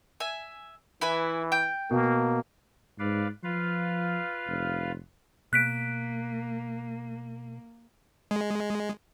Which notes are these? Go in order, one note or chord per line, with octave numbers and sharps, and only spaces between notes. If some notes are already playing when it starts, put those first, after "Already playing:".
E5 G#5
E3 E4 B4 G#5
G5
B2 A#3
G#2 B4 D5 F5
F3 F4 B4 F5
F1
B2 A#3 F#6 B6 D7
G#3